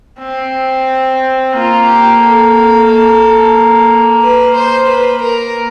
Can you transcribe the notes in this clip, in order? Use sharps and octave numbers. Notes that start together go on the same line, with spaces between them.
C4
A#3 F4
G4
A4
A#3
B4
C5
B4
A#4